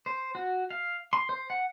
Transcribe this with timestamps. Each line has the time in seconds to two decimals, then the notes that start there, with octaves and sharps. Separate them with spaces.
0.06 C5
0.35 F#4
0.70 F5
1.13 C6
1.29 C5
1.50 F#5